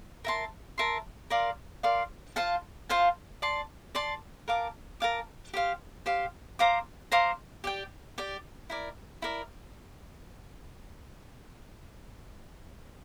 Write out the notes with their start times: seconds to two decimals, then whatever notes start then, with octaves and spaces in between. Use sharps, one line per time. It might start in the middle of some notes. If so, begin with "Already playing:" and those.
0.25 A#4 E5 A5 C6
0.78 A#4 E5 A5 C6
1.30 A#4 D5 F5 C6
1.83 A#4 D5 F5 C6
2.36 F4 C5 F5 A5
2.89 F4 C5 F5 A5
3.42 D5 A5 C6
3.95 D5 A5 C6
4.48 A#4 F5 A5 D6
5.00 A#4 F5 A5 D6
5.54 G4 C5 F5
6.06 G4 C5 F5
6.59 C5 F5 A#5 D6
7.12 C5 F5 A#5 D6
7.64 G4 D5 G5
8.18 G4 D5 G5
8.70 E4 A#4 D5
9.22 E4 A#4 D5